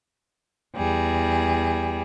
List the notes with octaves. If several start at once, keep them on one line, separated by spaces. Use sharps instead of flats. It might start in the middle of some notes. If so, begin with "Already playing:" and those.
E2 G3 G#4